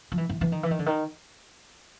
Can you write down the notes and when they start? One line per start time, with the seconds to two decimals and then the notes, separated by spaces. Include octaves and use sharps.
0.12 F3
0.18 E3
0.29 E3
0.41 E3
0.52 D#3
0.63 E3
0.71 D#3
0.79 D3
0.86 D#3